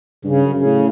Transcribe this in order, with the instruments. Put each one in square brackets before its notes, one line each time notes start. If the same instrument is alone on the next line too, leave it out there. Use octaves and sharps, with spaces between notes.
[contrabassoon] G2 [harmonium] C#3
[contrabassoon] F#2
[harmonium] C#3
[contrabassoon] A2